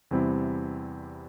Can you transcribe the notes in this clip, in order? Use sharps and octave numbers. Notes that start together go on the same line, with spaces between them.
E2 C3 G3 C4 E4